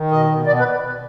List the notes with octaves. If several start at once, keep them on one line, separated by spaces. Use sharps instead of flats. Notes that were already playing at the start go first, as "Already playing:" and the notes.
Already playing: D#3
B2 D#5
B2
B2 D5
B4